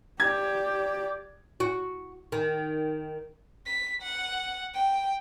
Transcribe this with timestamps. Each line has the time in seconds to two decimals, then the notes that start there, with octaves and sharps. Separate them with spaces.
0.20 G4 D5 G#6
1.60 F#4
2.32 D#3
3.66 B6
4.02 F#5
4.74 G5